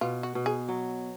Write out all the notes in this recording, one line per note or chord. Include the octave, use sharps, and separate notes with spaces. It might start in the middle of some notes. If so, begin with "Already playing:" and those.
B2 F4
F#4
B2
G#4
F#3